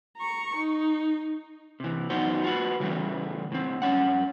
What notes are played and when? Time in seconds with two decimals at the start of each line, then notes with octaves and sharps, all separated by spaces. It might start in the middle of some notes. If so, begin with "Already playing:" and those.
0.17 A#5 C#6
0.57 D#4
1.80 C3 E3
2.10 F#2 B3 D#4 F#4 C5
2.44 F4 F#4 B4
2.80 C#3 E3 G3 A3
3.52 A2 C4
3.82 G2 G3 C#4 F#5